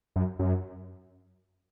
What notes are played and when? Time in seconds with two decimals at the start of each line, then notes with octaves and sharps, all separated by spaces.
0.16 F#2
0.39 F#2